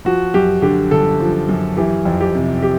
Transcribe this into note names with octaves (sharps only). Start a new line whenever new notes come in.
F3 F#4
F#2 G4
D3 G4
G1 A4
F3
F#2
E3 G4
F2
G4
C3
G4